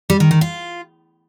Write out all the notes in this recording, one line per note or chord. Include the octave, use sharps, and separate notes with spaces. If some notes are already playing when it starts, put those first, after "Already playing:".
G3
D#3
D#3
F4